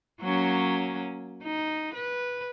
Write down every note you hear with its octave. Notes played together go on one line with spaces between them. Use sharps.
F#3 A#3 C#4
D#4
B4